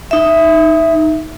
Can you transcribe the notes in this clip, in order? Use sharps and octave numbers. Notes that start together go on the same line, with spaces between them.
D#4 E5